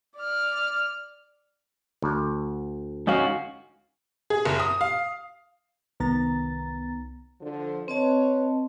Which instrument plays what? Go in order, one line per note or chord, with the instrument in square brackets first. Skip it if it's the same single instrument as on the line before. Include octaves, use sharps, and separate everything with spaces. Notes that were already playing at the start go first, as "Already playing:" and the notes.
[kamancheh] D5 F6
[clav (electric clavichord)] D2
[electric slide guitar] G#2 C#4 F#4 [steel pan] D#5 F5 G#5
[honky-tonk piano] G#4
F#1
D#6
F5
[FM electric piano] C2 D#3 B3 A#5 A6
[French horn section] D3 F3
[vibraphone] C4 D#5 A5 [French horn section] B4 C#5